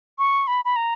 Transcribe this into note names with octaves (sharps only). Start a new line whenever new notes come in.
C#6
B5
B5
A#5